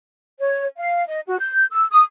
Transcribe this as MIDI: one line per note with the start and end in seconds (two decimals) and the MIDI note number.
0.39 0.66 73
0.77 1.04 77
1.07 1.20 75
1.26 1.37 66
1.38 1.65 91
1.70 1.86 88
1.92 2.03 87